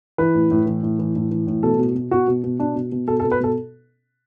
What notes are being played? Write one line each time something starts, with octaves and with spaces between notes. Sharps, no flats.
E3 B4
A2
A2
E3
A2
E3
A2
E3
A2
B2 A4
B2
B2
B2 F#4
B2
B2
B2 D4
B2
B2
B2 A4
A4
B2
B4
B2 A4